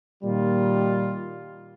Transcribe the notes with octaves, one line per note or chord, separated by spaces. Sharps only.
A#2 D#3 G3 F4